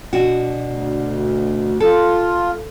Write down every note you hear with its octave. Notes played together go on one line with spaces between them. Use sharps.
B2 D4 F#4
D2
F4 A4